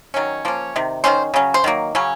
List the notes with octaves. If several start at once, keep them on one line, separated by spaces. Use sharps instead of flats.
D#3 F#3 C#4
F3 A#3 C#4
C3 D#3
D#3 A#3 C#4 C5
C#3 F#3 C#4
C5
D#3 F#3 A#3
C#3 F#3 C#4